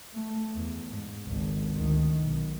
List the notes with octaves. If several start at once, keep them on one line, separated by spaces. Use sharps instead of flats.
A3
E2
G#2
G#1 C#2
D2 D#3
B1